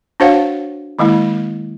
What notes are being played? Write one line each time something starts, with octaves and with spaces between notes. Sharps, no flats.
D4 F#4 C5 C#5 F5 F#5
D#3 G#3 A#3 E4